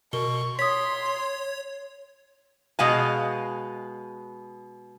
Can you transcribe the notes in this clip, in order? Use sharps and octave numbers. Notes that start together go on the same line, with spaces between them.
B2 A#4 C#6 G7
C#5 C6 D#6 B6
B2 G#3 F5 G#5